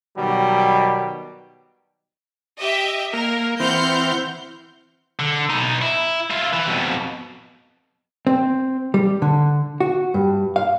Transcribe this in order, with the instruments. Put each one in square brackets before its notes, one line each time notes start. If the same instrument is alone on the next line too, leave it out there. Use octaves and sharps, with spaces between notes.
[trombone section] B2 D#3 F#3 G3
[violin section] G4 D#5 E5
[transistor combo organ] A#3 [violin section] A#4
[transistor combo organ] E3 C4 [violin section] F#5 F6 G6
[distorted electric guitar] D3
B2 D#4
E4
E4 F4
E3
F2 B2
[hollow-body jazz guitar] C4
G3
D3
F#4
G2
F5